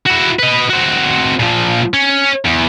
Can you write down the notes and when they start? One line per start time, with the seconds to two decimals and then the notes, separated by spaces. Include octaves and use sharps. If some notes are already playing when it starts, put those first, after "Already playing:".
0.06 E4 F#4
0.39 B4 D#5
0.70 C4 F#4
1.39 A#2 F3
1.93 C#4
2.45 E2